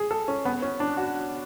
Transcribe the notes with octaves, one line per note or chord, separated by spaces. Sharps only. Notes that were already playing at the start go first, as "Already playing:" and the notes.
Already playing: G#4
A4
C#4
B3
C#4
D4
F#4